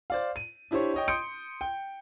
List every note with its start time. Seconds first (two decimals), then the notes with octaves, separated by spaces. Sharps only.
0.10 C5 D5 F5
0.36 D#7
0.71 D4 E4 G4 C5 C#5
0.94 C#5 D#5 G5
1.08 C6 D#6 G6 C#7 D7
1.61 G5